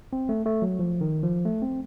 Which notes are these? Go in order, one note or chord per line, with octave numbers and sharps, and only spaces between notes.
C4
A3
A3
F#3
F3
D#3
F3
A3
C4